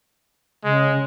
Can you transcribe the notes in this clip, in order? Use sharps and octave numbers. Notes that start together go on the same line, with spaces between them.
C#3 G#3